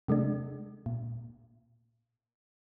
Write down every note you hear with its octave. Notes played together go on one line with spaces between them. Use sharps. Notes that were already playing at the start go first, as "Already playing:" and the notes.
C3 G#3 A3 D4
A#2